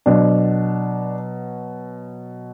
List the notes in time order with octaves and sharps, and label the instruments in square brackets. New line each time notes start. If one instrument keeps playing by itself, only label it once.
[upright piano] B2 F#3 D4